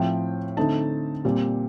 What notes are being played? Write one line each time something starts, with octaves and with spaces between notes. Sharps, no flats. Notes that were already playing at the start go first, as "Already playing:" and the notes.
Already playing: A2 F3 C4 G5
D3 A3 C4 D#4 A5
A#2 G3 C4